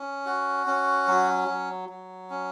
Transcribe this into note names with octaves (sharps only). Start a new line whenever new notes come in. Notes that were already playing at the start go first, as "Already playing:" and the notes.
Already playing: C#4
F#4
C#4
F#3
F#3
F#3
C#4